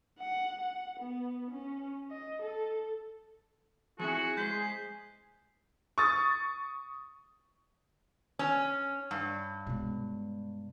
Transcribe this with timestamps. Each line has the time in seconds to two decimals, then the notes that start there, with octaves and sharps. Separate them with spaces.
0.20 F#5
0.62 F#5
1.00 B3
1.51 C#4
2.12 D#5
2.42 A4
3.99 F3 C4 E4 F#4 G#4
4.37 G#3 C5 C6 G6 B6
5.98 C#6 D#6 A6
8.39 C#4
9.11 G2
9.67 B2 G#3